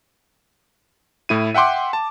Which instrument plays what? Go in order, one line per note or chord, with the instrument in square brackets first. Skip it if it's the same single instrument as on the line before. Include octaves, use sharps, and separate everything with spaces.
[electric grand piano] A2 E4 D#7
E5 F#5 G5 C6 D6
A5